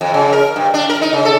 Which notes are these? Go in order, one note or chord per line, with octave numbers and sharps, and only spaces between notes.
F2
C#3
A#4
G2
D4
A#4
D#4
C#3
A4